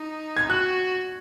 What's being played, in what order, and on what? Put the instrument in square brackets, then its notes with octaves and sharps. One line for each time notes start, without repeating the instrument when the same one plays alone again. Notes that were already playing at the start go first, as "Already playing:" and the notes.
Already playing: [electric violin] D#4
[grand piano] G#6
[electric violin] F#4 [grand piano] F#6